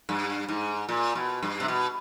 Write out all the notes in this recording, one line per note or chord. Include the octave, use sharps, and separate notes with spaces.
G2
G#2
A#2
B2
G2
C3
B2